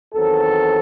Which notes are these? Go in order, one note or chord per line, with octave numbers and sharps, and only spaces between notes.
E2 D#3 F#3 C4 A4